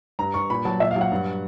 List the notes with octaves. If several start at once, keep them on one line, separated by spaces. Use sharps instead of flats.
G2 A#5
G2 C#6
A#2 B5
F#3 A5
A#2 E5
F5
F#3
F#5
G2